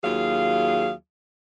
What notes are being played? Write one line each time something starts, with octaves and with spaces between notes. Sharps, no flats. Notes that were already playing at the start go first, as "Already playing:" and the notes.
D#2 F#3 F4 G#4 F5